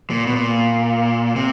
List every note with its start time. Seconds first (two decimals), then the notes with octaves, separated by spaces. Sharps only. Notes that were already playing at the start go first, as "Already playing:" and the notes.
0.10 A#2
0.27 B2
0.36 A#2
1.36 C3